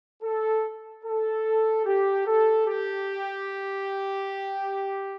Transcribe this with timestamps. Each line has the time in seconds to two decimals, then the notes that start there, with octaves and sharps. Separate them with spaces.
0.22 A4
1.04 A4
1.85 G4
2.26 A4
2.67 G4